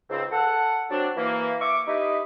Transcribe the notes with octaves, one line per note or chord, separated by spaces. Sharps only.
C#2 G#2 C#3 C4
A4 F#5
F#3 C4 D4
E3 A#3
E5 C#6 D6
D#4 E4 G4 B4 D#5